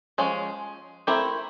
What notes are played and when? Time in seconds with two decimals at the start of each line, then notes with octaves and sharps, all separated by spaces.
0.18 F3 G#3 C#4
1.07 A3 C4 E4 G4 A#4